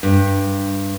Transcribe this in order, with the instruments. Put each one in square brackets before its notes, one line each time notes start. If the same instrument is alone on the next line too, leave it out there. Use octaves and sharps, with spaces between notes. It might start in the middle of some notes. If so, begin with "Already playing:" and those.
[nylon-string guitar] G2